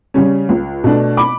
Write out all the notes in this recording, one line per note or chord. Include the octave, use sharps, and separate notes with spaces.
C#3 G3 C#4
C#2
B2 A3 D4
B5 D6